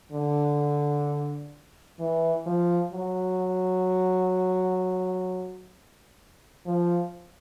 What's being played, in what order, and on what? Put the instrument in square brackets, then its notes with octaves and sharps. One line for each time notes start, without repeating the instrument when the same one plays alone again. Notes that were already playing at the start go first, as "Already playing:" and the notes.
[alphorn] D3
E3
F3
F#3
F3